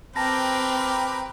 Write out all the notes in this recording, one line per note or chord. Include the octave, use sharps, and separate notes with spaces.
C4 G4 A#4 B4 A5 A#6